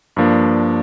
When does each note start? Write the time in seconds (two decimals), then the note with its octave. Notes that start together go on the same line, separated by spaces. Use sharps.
0.17 G2 F3 A#3 D4